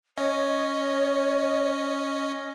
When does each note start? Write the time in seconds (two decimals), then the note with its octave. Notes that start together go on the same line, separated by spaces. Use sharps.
0.18 C#4 C#5 D#5